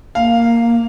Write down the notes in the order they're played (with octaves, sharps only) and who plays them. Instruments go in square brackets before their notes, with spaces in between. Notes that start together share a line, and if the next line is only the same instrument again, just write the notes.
[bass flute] A#3 [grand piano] F5